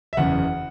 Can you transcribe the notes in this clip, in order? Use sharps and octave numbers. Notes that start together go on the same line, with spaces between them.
E5
F#1 E2 C#3 F#5